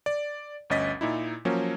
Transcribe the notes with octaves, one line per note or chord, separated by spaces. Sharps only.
D5
G1 D2 C#4 D#5 A6 B6
A#2 D#4 E4
F3 F#3 A#3 C#4